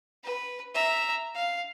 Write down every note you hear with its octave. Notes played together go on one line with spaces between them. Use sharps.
B4
E5 A#5
F5